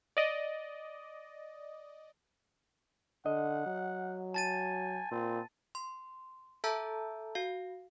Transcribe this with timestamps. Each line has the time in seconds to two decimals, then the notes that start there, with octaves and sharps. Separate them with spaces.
0.17 D5 D#5
3.26 D3 D#5 F#5
3.66 F#3
4.34 G#5 A5 A6 D#7
5.11 A#2 C4
5.75 C6
6.64 A4 E5 A5 A#5 E6 G6
7.35 F#4 F5